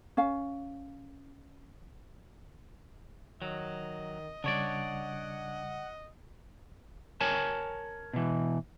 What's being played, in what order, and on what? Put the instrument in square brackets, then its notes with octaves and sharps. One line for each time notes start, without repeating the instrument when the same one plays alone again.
[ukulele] C#4 F5
[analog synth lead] D#3 [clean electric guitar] F#3 [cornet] D#5
[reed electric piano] C#3 G3 [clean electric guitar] D4 C#5 D5 [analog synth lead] F#5
[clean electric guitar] A#4 C#5 G#5 A5
B2 E3